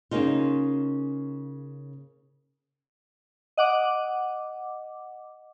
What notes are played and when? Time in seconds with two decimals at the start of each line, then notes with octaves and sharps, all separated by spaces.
0.11 C#3 A#3 C#4 D#4 F4
3.57 D#5 F#5 D6